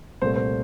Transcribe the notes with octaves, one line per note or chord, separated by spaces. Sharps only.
C2 A#2 A3 C5
C5